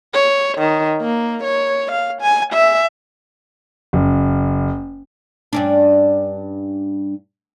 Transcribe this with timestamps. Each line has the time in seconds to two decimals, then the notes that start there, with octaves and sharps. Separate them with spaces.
0.14 C#5
0.58 D#3
1.01 A#3
1.43 C#5
1.92 F5
2.22 G#5
2.53 E5
3.93 F#1
5.53 G2 C#4 D4